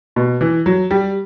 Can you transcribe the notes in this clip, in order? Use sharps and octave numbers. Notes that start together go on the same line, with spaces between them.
B2
E3
F#3
G3